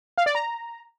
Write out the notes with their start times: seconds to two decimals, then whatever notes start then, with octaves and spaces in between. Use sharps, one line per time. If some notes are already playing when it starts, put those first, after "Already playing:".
0.18 F5
0.26 D5
0.35 A#5